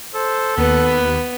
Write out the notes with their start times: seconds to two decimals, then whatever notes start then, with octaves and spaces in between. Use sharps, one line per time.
0.15 A4 C5
0.58 D#2 B3 B4